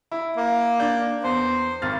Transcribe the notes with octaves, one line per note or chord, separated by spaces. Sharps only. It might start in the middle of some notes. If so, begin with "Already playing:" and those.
E4
A#3
D4 G6
E2 C5
G#1 F6 A6